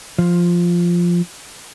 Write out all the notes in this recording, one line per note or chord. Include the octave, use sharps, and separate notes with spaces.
F3 F4